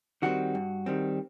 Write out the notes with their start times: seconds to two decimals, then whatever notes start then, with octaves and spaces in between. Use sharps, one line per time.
0.22 D#3 G3 C4 F#4
0.55 G2
0.86 D#3 G3 C4